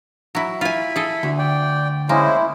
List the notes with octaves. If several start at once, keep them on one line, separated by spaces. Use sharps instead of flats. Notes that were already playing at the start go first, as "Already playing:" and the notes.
F#3 E4
E4 F4 G#5 B5
G#4 A4
D2
D5 G5
G#3 A#3 C#4 E4 C5